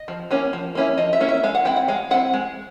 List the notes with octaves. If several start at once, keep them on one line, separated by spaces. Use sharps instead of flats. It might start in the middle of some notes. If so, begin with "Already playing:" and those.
Already playing: D#5
F3
A#3 C#4 E4
F3
A#3 C#4 E4
F3 D#5
E5
A#3 C#4 E4
E5
G#3 F5
F#5
C4 E4 G5
F#5
G#3 F5
C4 E4 F#5
G#3